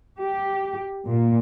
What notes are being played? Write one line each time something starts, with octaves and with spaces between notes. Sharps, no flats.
G4
A#2